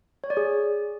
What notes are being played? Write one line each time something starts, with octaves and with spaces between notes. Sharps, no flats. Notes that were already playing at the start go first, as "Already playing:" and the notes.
C#5
D5
G#4